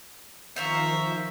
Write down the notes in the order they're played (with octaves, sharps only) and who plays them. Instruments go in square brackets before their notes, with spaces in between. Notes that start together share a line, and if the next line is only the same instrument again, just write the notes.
[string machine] D#3 F3 [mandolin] C5 F5 C#6 [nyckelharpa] E5 A#5